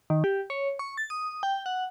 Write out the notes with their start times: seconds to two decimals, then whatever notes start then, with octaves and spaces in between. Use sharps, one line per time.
0.10 D#3
0.24 G4
0.50 C#5
0.79 C#6
0.98 A6
1.10 D#6
1.43 G5
1.66 F#5